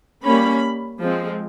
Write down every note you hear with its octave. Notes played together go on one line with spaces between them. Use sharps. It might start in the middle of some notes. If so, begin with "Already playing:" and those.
G3 A#3 C#4 B5
F3 G#3 C4